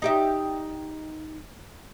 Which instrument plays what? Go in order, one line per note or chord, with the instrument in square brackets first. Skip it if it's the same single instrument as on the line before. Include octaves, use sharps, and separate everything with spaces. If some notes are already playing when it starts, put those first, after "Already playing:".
[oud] D#4 G4 E5